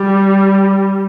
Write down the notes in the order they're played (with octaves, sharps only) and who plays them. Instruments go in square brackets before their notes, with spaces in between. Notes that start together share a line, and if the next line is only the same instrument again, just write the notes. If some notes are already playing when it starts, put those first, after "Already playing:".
Already playing: [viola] G3